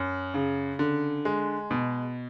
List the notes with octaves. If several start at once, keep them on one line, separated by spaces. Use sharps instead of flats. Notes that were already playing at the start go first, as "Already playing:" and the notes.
Already playing: F#2
C#3
D3
G#3
B2